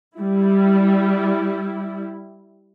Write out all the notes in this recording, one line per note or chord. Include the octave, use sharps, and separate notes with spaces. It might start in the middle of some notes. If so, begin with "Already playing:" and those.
G3 E4